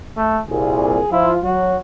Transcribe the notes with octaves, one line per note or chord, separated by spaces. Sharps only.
A3
C2 A#2 G#4
F3 E4 F4
F#3 F#4